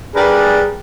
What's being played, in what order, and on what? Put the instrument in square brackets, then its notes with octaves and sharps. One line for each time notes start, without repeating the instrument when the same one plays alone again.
[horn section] G3 D4 G#4 A#4 B4